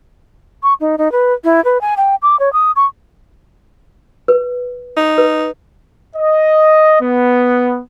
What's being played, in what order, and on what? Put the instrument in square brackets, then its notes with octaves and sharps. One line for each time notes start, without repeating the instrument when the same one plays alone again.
[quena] C#6
D#4
D#4
B4
E4
B4
G#5
G5
D6
C#5
D#6
C#6
[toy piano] B4
[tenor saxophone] D#4
[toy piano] B4
[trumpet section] D#5
B3